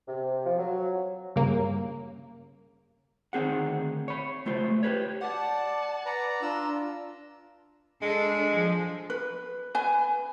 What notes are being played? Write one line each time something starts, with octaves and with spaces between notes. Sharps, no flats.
C3
F3
F#3
G2 C#3 A#3
D2 D#3 C4 G#4 F#5
C#5 B5
C#2 A3 F4 C5
G4 G#4 B4 C#5
D5 F#5 A5
B4 D5 A#5
D4 F4 A#5 E6
G#3 D4 A4
F3
B4
B4 G#5